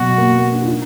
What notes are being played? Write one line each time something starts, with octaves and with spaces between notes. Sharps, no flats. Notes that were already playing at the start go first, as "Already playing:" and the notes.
Already playing: B2 F#3 F#4
A#3
B3
D4
F4
D#4